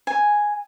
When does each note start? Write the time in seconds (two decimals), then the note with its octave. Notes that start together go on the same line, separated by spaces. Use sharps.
0.07 G#5